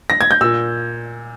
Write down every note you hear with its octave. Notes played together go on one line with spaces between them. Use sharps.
A#6
G#6
G6
A#2 E6